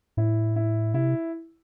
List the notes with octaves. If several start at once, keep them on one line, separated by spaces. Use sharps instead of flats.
A2 E4
E4
C3 E4